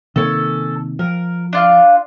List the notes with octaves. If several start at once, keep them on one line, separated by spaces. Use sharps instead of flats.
C3 D#3 A#3 C#4 A4
F3 A#4
D4 F4 F5